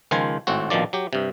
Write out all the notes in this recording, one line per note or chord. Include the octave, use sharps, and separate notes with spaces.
C#2 D#3 F3 C5 G#5
G#1 A2 C4 F#4
A#1 B2 D#3 F3 D5
F#3 G4
G2 C3